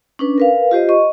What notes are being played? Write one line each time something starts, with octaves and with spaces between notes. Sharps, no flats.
C#4 D4 B4
A#4 B4 F5
F4 G4 C5 D#5
D#5 C#6